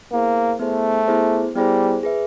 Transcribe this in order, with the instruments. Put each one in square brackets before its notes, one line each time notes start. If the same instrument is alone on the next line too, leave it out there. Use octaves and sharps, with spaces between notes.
[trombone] A#3 [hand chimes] B3 E4 G#4 C5
[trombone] A3 [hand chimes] B3 E4 G#4 C5
[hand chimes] B3 E4 G#4 C5
[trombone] G3 [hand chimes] B3 E4 G#4 C5
[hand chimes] G#4 B4 E5